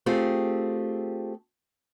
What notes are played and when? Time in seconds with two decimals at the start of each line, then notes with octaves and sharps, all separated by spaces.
0.06 A3 C4 F4 G4 G#4